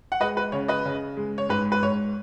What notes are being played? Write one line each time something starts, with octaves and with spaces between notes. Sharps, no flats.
F#5
G#3 B4 D#5
B4
C#3 C#5
B4 D#5
C#3
G#3
C#5
G#2 B4
B4
G#2 C#5